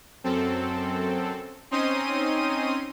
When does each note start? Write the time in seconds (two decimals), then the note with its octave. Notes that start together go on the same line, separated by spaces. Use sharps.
0.24 F#2 C4 A4
1.71 C4 C#4 D#4 C6 D#6 D#7